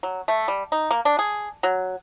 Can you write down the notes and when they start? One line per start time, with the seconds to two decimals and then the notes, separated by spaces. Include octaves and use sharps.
0.03 F#3
0.28 A3
0.48 G3
0.72 D#4
0.91 A#3
1.05 D4
1.19 G#4
1.63 F#3